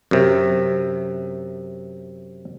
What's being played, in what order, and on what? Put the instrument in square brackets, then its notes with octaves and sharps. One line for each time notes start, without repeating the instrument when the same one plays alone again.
[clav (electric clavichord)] F#2 C3